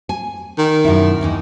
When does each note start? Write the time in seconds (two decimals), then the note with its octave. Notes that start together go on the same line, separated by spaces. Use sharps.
0.09 G#5
0.58 D#3
0.85 F#2 B2 E4
1.21 D#2 E3 D#4